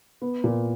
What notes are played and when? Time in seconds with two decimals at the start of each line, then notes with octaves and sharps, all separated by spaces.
0.22 B3
0.44 A#2